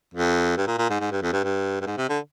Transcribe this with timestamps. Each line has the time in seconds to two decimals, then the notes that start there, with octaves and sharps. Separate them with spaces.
0.14 F2
0.57 G2
0.67 A#2
0.78 A#2
0.90 G#2
1.00 G#2
1.11 G2
1.22 F2
1.33 G2
1.44 G2
1.81 G2
1.87 G#2
1.97 C3
2.09 D3